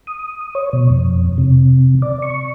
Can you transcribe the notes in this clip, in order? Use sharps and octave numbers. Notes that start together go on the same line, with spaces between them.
D#6
C#5
B2
F2
C3
D5
C#6